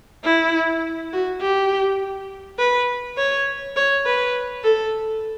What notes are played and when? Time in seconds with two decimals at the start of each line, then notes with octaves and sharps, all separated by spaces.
0.24 E4
1.12 F#4
1.41 G4
2.59 B4
3.18 C#5
3.76 C#5
4.05 B4
4.64 A4